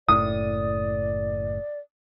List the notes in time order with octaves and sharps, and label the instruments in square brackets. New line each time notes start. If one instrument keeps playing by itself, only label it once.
[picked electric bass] F#1 A2 [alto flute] D5 [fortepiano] D#6